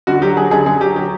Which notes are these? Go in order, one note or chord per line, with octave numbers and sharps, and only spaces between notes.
D3 F#4
F#3 G4
F#3 G#4
D3 G#4
D3 G#4
F#3 G4
F#3 G4